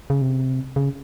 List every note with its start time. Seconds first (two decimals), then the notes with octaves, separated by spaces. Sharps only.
0.10 C#3
0.22 C3
0.76 C#3